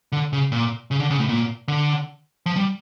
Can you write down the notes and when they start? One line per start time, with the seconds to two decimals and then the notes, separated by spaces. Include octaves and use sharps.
0.12 D3
0.33 C#3
0.52 A#2
0.91 C#3
1.00 D3
1.11 C#3
1.20 A2
1.29 A#2
1.68 D3
2.46 F3
2.56 G3